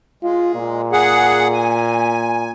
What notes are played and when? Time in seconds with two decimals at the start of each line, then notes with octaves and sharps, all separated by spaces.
0.23 G#3 F4
0.55 A#2
0.92 G#4 F#5
1.54 G#5